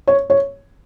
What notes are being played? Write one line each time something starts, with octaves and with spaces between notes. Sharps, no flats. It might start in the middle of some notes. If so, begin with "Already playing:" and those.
C#5
C#5